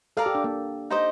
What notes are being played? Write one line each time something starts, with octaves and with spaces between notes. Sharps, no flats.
A4 A#4 D5 F5
G4
D4
A#3
D#4 G4 C5 D#5